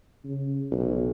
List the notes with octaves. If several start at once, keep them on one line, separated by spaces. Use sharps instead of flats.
C#3
B1